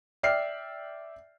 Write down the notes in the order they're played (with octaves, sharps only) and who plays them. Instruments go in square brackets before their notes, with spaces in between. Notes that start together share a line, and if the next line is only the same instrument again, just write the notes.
[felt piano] D5 E5 G5 F6 C7